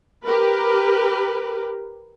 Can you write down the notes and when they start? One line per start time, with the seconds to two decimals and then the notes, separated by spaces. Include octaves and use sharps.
0.25 G4 A#4 B4